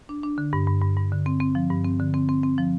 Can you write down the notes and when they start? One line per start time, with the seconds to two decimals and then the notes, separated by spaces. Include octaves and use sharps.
0.09 D4
0.23 D4
0.38 D3
0.53 G2
0.68 G2
0.82 G2
0.97 G2
1.12 D3
1.26 C4
1.40 C4
1.55 F3
1.70 G2
1.84 C4
2.00 D3
2.14 C4
2.29 C4
2.43 C4
2.58 F3